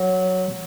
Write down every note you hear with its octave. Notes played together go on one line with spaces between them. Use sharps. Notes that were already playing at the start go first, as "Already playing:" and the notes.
Already playing: F#3